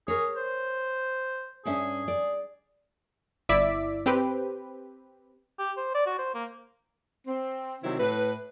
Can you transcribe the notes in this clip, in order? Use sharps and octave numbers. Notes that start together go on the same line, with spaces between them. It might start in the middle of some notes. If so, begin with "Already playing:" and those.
G#4 A#4 C#5
C5
G2 C#4 G#4 E5
D5
G1 E4 D5 E5 D6 B6
C4 G4 B4
G4
C5
D5
F#4
C5
A#3
C4
C3 D#3 F#3 C4 E4
A2 B4